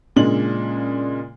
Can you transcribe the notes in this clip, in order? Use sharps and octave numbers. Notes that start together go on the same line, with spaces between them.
A#2 C#3 G#3 D4 F#7